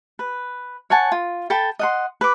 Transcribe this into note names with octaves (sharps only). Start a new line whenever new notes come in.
B4
C#5 F#5 G#5 A5
F4
A4 G5 A5 B5
D#5 F#5 C6
B4 D6